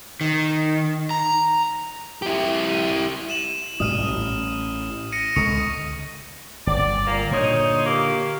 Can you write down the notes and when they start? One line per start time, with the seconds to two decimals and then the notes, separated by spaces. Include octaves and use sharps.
0.21 D#3
1.11 A#5
2.22 E4 G4
3.29 D#7 E7 F#7
3.80 G#2 B2 G3 D#6 F6 D#7
3.98 A1
5.12 A#6 C#7 D#7
5.36 C#2 D3 G#3 C#6 D#6 C#7
6.67 G1 D5
7.06 A#2 A#3
7.31 A#2 D3 D#4 C5 C#5
7.84 A#3 C#4 G4